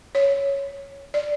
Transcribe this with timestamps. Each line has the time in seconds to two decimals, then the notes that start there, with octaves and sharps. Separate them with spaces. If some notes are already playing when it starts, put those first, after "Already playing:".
0.15 C#5
1.14 D5